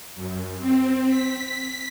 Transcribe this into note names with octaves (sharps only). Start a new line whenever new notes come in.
F#2
C4
B6